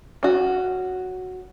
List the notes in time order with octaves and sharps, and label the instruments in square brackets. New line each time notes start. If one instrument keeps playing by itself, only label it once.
[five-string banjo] C#4 F#4